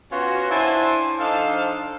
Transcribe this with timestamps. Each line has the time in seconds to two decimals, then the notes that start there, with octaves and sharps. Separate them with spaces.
0.12 B3 C#4 F4 F#4
0.51 D4 E4 C5 G#5 A5 C6
1.20 F3 D4 D#4 A4 C5 F5